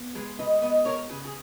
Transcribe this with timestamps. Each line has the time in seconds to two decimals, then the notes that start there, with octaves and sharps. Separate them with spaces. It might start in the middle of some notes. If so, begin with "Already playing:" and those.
Already playing: B3
0.15 G#3 G#4 B4
0.39 B4 D#5
0.62 B3 B4 D#5
0.85 A#4 C#5
1.09 C#3 G#4 B4
1.25 G#4